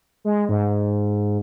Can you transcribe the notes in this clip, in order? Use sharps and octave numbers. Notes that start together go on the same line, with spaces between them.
G#3
G#2